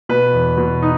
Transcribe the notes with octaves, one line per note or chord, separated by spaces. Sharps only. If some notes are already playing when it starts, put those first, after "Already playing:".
B2 B4
E2
B2
D#4